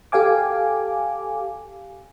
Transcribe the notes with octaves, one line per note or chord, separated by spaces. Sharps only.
G4 A4 F5 G#5 D6